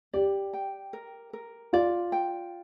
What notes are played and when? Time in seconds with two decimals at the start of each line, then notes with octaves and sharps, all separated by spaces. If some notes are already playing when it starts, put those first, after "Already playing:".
0.13 G4 D5
0.53 G5
0.93 A#4
1.33 A#4
1.73 F4 D5
2.12 G5